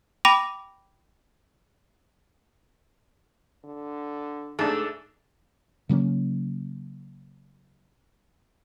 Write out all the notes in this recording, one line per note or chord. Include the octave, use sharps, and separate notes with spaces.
G5 B5 D6 A#6 D#7 F7
D3
G#2 A3 D4
C#3 F#3 A#3 C#4